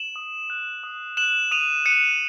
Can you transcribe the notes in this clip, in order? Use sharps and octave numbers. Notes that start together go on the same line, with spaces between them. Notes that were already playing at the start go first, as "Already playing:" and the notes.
Already playing: E7 F#7
D#6
F#6
D#6
F#6 E7 F#7
D#6 D#7 F7
F#6 C#7 D#7